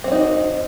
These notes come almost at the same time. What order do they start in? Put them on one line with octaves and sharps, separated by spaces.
C4 C#4 D#4 F#4